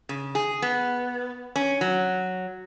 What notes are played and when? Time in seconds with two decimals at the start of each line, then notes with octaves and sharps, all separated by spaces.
0.09 C#3
0.35 G#4
0.62 B3
1.56 C#4
1.81 F#3